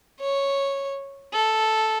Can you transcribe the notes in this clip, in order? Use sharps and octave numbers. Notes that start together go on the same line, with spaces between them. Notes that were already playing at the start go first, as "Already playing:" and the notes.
C#5
A4